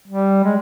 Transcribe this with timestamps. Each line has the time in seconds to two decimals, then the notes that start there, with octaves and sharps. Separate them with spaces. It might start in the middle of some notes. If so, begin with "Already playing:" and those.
0.08 G3
0.44 G#3